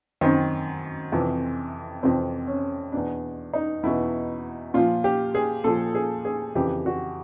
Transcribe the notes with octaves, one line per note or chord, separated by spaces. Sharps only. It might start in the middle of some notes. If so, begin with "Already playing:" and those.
F#2 D#3 C4
F2 C3 E3
F2 C3 E3 C4
C#4
E2 B2 D4
D#4
E2 B2 E4
A#2 F3 F4
G4
G#4
A#2 F3 A4
G#4
G#4
F2 C#3 E3 G4
F#4